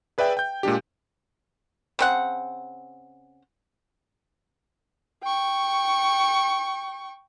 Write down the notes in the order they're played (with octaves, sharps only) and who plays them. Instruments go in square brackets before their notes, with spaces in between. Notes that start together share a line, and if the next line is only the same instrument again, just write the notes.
[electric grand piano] G#4 B4 D5 E5 G5
G5 G6
A#2 G#3 D4 G4
[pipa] C#3 C4 F#5
[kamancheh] G5 C#6